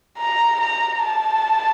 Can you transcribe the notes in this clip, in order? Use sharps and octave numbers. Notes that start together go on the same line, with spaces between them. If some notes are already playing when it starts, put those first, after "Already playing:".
A#5
A#5
A5